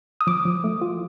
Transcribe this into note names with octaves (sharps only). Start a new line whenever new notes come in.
D#6
F3 D6
F3
A3
F4